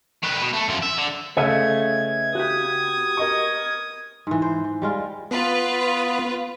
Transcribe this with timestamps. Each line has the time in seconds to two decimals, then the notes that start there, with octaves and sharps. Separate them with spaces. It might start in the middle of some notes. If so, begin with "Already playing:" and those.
0.23 D#3 B4
0.41 B2
0.53 A3
0.68 F#2 F3
0.83 E5
0.98 D3
1.37 C#3 A3 B4 D#5 E5 G#6 C#7
2.35 F#4 G4 D#6
3.17 A#4 D#5 C#6
4.27 G#2 E3
4.42 C5
4.64 E3
4.82 G3 G#3 F4
5.31 B3 F4 B4